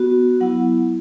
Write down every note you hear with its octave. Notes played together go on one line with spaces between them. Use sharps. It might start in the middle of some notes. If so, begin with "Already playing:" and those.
Already playing: B3 F#4
F#3 B3 E4 F#5